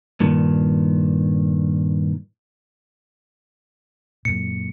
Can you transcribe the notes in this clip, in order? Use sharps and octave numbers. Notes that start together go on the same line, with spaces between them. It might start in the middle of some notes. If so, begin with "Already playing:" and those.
G2 A#2 D#3
F#2 A#2 C#7